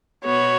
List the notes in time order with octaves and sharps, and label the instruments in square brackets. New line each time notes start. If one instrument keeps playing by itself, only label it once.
[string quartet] B2 B3 F#4 [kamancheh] C#5